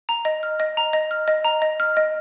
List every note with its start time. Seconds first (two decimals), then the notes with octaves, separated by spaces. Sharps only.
0.09 A#5
0.25 D#5
0.43 F6
0.60 D#5
0.77 A#5
0.93 D#5
1.11 F6
1.28 D#5
1.45 A#5
1.62 D#5
1.80 F6
1.97 D#5